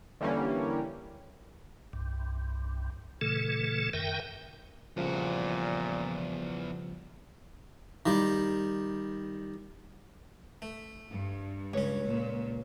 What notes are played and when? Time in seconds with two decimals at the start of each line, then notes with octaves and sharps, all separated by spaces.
0.21 D3 E3 G3 A#3 C#4
1.93 C2 G2
3.21 A#2 C#3 E3 A3 A4
3.93 F#2 D#3 A#4 E5 G5
4.97 E2 A#2 C#3 F3 G3 F#4
8.06 D#3 G3
10.62 A3
11.10 G2
11.74 C#2 C#4 C#5
12.07 A#2